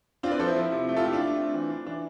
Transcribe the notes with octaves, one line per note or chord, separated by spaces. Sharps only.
C4 D4 F4
B4 D5
F3 A4 C5
E4
F3
C3
A3
F4 A4
A3 E4 G4
D4 F4
A3
C4
E3
D4
E3 D4